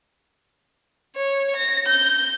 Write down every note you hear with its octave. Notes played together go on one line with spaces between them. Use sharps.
C#5
A#6
G6